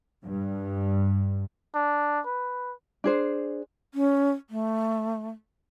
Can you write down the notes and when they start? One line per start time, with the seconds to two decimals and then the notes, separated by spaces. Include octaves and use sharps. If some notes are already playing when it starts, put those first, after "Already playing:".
0.23 G2
1.75 D4
2.26 B4
3.04 D4 G#4 C5
3.94 C#4
4.50 A3